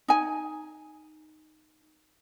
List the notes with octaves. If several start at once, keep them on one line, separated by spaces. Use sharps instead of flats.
D#4 G#5